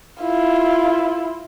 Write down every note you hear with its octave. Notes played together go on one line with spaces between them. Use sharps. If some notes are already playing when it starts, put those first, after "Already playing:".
E4 F4